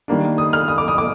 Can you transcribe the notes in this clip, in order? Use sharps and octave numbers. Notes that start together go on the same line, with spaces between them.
D#3 G3 A#3 D4
D#6
F6
D#6
D6
D#6
D6